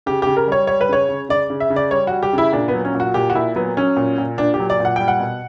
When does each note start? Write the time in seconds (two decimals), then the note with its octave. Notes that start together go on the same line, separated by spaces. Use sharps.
0.06 C#3 G4
0.22 C#3 G4
0.37 A#4
0.48 G3 C#5
0.67 G3 C#5
0.81 B4
0.89 C#3 C#5
1.09 C#3
1.29 C#3 D5
1.50 C#3
1.60 E5
1.70 C#3
1.76 D5
1.91 G3 C#5
2.07 G3 F#4
2.23 G4
2.33 C#3 E4
2.53 A#2 D4
2.68 B3
2.73 F#3
2.85 C#4
2.95 A#2
3.00 F#4
3.14 A#2 G4
3.30 F#4
3.35 A#2 E4
3.56 F#3 B3
3.77 F#3 C#4
3.97 A#2
4.18 A#2
4.38 A#2 D4
4.54 G4
4.60 F#3
4.70 D5
4.80 A#2 F#5
4.96 G3 G5
5.08 F#5
5.20 B2